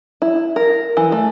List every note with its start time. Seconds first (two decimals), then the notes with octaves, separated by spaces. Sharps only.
0.22 E4
0.56 A#4
0.97 E3
1.12 A3